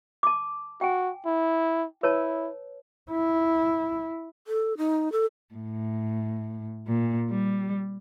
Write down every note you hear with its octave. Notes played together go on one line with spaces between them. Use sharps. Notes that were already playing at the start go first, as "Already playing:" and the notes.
A5 D6
F#4 G5 G#5
E4
E4 B4 C#5 A5
E4
A4
D#4
A4
A2
A#2
G3